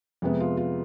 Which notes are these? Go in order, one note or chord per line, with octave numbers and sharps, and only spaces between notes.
F2 C3 G#3 B3 G#4
F4
F4